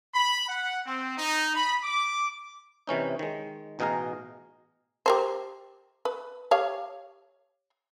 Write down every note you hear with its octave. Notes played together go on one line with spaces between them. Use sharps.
B5
F#5
C4
D#4
B5
D6
C3 E3 C#4 D#4
D#3 G#3
A1 B2 D#4 G#4 F5 A#5
G4 A#4 C5
B4
G4 C#5 F5